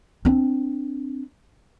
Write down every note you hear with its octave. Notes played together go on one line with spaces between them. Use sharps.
C4 D4